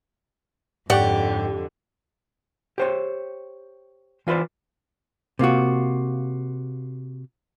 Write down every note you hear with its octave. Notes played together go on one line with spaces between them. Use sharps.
F2 G#2 D3 G4 C#5 D5 F#5 G5
G4 C5 C#5
E3 F4 B4 C5 D5
C3 A#3 F4 F#4